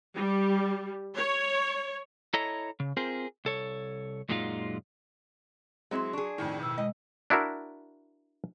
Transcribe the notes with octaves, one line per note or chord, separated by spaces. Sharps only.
G3
C#5
E4 A4 C#5 D#5 A#5
C#3
C4 F4 G#4 A#4 C5
C2 A4 C#5
F#2 A#2 F#3 G#3 D#4 F4
F#3 G#3 C4 E4 G#4 C6
D4 G#4 C#6
F2 A2 D#3
B2 E6
G#3 D#5
D4 E4 F#4 A#4 E5